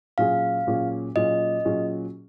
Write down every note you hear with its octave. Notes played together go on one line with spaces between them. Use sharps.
A#2 F#3 C#4 F4 G#4 F5
A#2 F#3 C#4 F4 G#4
A#2 F#3 C#4 F4 G#4 D#5
A#2 F#3 C#4 F4 G#4